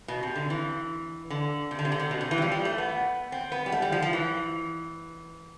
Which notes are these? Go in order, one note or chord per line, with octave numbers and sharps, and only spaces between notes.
B2
C3
D3
E3
D3
C3
D3
C3
D3
C3
B2
C3
E3
G3
F3
G3
A3
B3
C4
B3
G3
A3
G3
F3
F3
E3